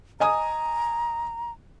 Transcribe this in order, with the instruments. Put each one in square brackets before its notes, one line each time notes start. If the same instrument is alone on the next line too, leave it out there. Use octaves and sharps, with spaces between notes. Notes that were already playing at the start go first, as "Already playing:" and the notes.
[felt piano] D#5 G#5 D#6 [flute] A#5